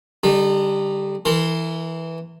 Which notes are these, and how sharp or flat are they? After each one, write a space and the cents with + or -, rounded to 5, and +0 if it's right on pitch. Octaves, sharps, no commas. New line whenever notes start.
D3 -30 G3 +0 D#4 -30
E3 -5 A#4 -40 C6 +0